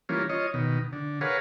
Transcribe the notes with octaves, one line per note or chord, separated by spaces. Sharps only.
E3 G3 A#3 C#4 F4
F4 C#5 D#5
B2 D#3
D3
G#4 A#4 B4 C#5 F5 F#5